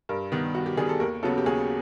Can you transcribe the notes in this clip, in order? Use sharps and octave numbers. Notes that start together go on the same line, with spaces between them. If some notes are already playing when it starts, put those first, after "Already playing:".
G2 A#4
D#3 G3 B3 G4
G2 F#4
G4
D#3 G3 B3 G#4
A4
D#2 A#4
C#3 F#3 B3 A4
G4
D#2 G#4